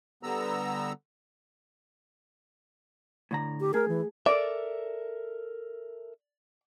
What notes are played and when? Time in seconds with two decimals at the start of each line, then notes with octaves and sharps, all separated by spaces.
0.23 D3 G3 B3 A#5 E6
3.31 A2 D3 A#5
3.60 G4
3.74 A3 G#4 A#4
3.88 E3
4.26 A4 A#4 D5 E5